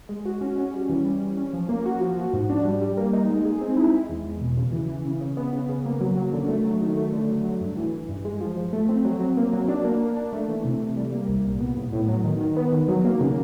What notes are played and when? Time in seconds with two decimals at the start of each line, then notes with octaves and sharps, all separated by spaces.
0.09 G#3
0.26 F#4
0.41 C#4
0.58 C#4
0.73 G3
0.89 E3
1.05 G3
1.21 G3
1.37 C#4
1.53 F3
1.69 A#3
1.86 F#4
2.01 F3
2.17 F3
2.33 G#2
2.50 D4
2.65 G3
2.81 G3
2.97 A#3
3.13 D#4
3.29 G#3
3.45 G#4
3.61 C4
3.77 E4
3.93 G#3
4.09 E2
4.25 E2
4.41 B2
4.57 C#3
4.72 E3
4.89 E3
5.05 C#3
5.21 C#3
5.37 B3
5.53 C#3
5.69 C#3
5.86 A#3
6.01 F#3
6.17 F#3
6.33 D3
6.49 A3
6.65 F#3
6.82 D#3
6.97 A3
7.13 D3
7.29 F#3
7.45 F#3
7.61 G2
7.77 E3
7.93 E3
8.09 G2
8.25 G#3
8.41 F3
8.57 F3
8.73 A3
8.89 C4
9.05 F#3
9.21 F#3
9.37 A#3
9.53 F#3
9.68 D4
9.85 A#3
10.00 A#3
10.17 D4
10.33 A3
10.48 E3
10.65 C3
10.81 C3
10.97 G3
11.13 A#3
11.29 C2
11.45 A#2
11.61 B3
11.77 A2
11.92 A2
12.08 F#3
12.24 D#3
12.41 D#3
12.56 B3
12.72 D#3
12.88 F#3
13.05 A#3
13.21 C#3